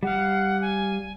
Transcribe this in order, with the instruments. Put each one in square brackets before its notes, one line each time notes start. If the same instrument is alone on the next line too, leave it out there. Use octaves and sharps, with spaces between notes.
[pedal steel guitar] G3 F5 [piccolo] F#5
[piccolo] G#5